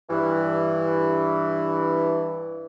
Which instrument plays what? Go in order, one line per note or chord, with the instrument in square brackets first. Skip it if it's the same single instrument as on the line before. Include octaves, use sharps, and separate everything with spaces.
[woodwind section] G2 E3